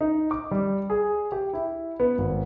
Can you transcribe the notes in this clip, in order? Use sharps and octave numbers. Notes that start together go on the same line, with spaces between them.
D#4
D6
G3
G#4
G4
E4
B3
G#1